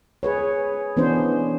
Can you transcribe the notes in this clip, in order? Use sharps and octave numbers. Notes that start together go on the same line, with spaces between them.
G#4 B4 C#5
E3 B3 C#4 D4 C5